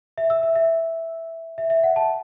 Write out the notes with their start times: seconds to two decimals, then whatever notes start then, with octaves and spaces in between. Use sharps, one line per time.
0.18 E5
0.30 E6
0.43 E5
0.56 E5
1.58 E5
1.70 E5
1.83 F#5
1.96 A5